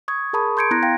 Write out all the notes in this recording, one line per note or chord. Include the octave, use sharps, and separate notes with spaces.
C#6 D#6 G#6
G#4 A#4 A5 B5 C#6 D#6
C6 G6 G#6 C#7 D7
B3 E4 A#5 F#6 G#6 A#6
F5 G5 A#6